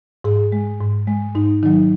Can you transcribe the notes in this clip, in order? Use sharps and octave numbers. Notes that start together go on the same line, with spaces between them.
G#2 G#4
G#3
G#2
G#3
G#2 D#4
D#3 F#3 D#4